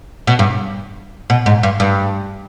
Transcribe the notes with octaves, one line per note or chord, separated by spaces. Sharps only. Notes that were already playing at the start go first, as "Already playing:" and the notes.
B2
G2
B2
G#2
G2
G2